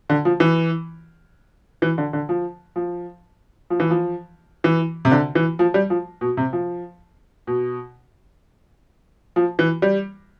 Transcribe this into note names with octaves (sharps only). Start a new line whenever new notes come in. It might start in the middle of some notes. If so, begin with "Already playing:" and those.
D3
F3
E3
E3
D3
D3
F3
F3
F3
E3
F3
E3
C3
D3
E3
F3
G3
F3
B2
C3
F3
B2
F3
E3
G3